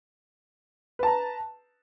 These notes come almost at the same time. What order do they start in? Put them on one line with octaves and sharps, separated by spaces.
B4 A5 A#5